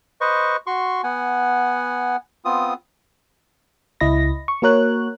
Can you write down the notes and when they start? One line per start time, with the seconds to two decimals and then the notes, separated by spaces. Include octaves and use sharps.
0.21 B4 C5 D#5 C#6
0.67 F#4 C6 C#6
1.04 B3 F#5 G#5
2.45 B3 C4 F4 D#6
4.00 C#2 E4 D#5 B5 A#6
4.48 C#6
4.62 A#3 F#4 A#4 C#5 F#6